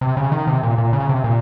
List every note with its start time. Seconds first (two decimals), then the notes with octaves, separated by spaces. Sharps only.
0.01 C3
0.17 C#3
0.32 D#3
0.47 C3
0.63 A#2
0.78 A#2
0.93 C#3
1.09 C3
1.24 A#2